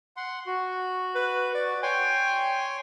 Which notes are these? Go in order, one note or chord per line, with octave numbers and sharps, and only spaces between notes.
F#5 C6
F#4
B4
D5
C#5 G5 G#5 C6